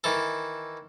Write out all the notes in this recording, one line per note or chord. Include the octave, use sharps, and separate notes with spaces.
D#3 E3 A4